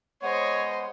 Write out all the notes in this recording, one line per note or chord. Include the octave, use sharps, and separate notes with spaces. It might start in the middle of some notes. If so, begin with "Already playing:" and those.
G#3 B3 C5 C#5 D#5